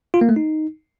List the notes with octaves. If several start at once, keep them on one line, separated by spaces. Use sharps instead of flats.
F4
A#3
A3
D#4